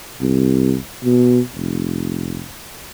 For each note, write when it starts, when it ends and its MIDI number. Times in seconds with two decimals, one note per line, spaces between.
0.21 0.76 36
1.04 1.40 47
1.55 2.44 29